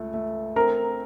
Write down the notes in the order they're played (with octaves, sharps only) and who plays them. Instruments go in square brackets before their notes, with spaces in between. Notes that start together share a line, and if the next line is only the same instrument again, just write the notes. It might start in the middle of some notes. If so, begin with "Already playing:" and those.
Already playing: [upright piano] C#2 A3
A3
[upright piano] C4 [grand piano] A#4 A#5